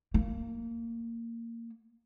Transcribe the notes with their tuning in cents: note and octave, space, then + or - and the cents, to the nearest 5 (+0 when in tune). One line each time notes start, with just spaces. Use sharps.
A#3 -15